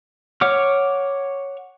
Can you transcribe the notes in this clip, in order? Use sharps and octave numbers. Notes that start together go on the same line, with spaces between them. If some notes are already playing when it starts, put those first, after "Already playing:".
C#5 F#5 D6 F6